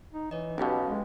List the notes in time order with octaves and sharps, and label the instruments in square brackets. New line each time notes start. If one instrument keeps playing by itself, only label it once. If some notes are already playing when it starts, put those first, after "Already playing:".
[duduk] D#4
[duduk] E3 [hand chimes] C#5 D#5
[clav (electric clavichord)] B1 B2 [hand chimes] C#4 B4 F5 [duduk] G4
[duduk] G#3